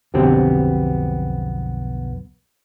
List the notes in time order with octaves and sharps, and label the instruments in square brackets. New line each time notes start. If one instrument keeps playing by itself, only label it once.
[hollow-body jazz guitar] B1 F2 D3 B3 C4 G4